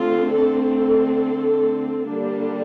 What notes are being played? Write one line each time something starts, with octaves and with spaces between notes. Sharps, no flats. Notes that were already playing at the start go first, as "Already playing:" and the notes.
Already playing: D3 A3 C4 F4
A4
A4
D3 G3 A#3 D4